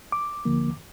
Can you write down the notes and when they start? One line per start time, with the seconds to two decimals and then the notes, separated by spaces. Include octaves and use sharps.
0.12 D6
0.45 D2 D3 F3 A#3